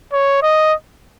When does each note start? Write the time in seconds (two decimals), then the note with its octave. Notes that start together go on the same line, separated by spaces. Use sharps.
0.13 C#5
0.42 D#5